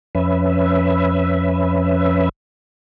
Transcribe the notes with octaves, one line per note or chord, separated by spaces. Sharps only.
F2 C#4 B4 E5